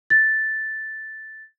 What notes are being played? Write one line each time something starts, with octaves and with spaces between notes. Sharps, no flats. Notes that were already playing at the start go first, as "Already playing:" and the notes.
A6